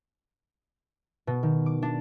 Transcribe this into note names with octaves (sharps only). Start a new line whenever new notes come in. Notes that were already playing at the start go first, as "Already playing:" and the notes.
B2
D#3
D6
D4